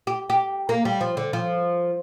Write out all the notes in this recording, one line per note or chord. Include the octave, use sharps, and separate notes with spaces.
G4
G4
A#3
G3
F3
D3
F3